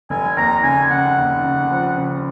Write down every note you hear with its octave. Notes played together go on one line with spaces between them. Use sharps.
F1 G#5
D#2 A#5
C#3 G#5
C#3 F#5
D#2
C#3
F3
C#3